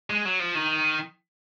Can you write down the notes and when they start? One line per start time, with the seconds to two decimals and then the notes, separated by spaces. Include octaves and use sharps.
0.10 G#3
0.25 F#3
0.40 F3
0.55 D#3